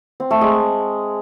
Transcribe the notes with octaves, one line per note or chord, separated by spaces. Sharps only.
C4
A3
G#3